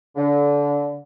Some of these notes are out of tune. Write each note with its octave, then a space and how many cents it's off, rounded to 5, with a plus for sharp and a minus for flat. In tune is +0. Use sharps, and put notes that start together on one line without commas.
D3 -25